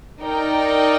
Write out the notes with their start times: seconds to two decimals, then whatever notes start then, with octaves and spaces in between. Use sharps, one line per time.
0.19 D#4 A#4 D5 G5